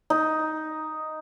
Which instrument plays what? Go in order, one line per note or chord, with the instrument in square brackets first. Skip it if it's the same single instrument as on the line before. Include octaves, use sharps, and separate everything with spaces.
[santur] D#4